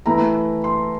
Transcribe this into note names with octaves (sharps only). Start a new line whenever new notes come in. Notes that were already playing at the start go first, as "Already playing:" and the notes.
E3 A3 E4 A#5
C6